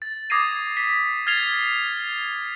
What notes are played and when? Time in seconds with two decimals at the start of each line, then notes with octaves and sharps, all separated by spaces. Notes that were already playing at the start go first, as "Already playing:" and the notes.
0.02 A6
0.30 D6 D#6 G#6 A#6 C7 D#7
0.77 B6
1.27 F6 G#6 A6 C7 F7 G7